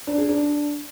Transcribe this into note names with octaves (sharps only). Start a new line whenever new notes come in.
D4
G#4
D4